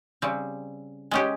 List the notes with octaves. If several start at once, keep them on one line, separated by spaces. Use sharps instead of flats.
C#3 G3 C4
G#3 C#4 G4